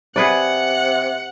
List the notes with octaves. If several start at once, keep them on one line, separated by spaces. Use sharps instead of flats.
C3 G#4 B4 D5 F#5